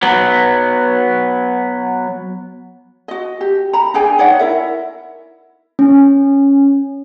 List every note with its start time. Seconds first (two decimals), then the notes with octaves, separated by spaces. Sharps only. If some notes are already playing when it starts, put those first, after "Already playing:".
0.03 F#3 B3
3.08 F#4 D#5
3.41 G4
3.73 A#5 B5
3.94 D4 G#4 G5 G#5
4.19 D#4 C#5 D5 F#5
4.39 E4 A#4 E5
5.79 C#4